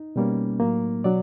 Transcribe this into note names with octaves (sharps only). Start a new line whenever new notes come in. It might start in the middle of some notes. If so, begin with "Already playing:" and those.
Already playing: D#4
B2 G3 A#3 C#4
A2 F#3 A#3
B2 F#3 D4 D5